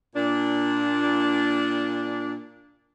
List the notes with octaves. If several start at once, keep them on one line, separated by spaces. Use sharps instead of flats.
A#2 D4